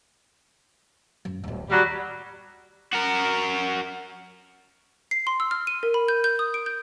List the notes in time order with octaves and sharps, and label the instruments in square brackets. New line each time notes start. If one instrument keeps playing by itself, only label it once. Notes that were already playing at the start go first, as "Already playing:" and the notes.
[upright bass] F#2
D1 B3
[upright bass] D#2 [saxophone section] F#3 G3
[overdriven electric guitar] F#4 A#4
[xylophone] C7
C6
E6
F6
D#7
A#4
B5
G6
G6
D#6
D7
G6